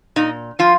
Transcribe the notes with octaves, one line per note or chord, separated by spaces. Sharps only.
A#2 D#4
F3 F4